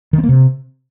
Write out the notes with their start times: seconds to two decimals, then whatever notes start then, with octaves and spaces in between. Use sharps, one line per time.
0.13 D#3
0.18 C4
0.23 A#3
0.29 C3